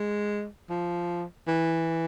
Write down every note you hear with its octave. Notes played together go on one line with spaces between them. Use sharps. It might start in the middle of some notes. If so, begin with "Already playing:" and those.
Already playing: G#3
F3
E3